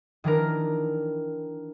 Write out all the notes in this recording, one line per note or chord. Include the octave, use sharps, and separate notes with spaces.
D#3 E3 D4 A#4